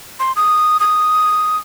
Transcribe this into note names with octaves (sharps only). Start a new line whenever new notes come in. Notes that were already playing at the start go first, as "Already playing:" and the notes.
C6
D#6
D#6